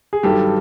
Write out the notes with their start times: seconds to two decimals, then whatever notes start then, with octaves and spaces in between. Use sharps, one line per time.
0.13 G#4
0.23 G2 D#3 F#3 G4 A4